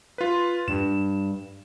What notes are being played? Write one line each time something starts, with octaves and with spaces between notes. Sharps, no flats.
F4 B4
G2 E7